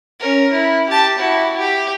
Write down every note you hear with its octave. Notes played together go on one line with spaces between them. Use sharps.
C#4 A#4
E4
G4 A5
E4 F#4
G4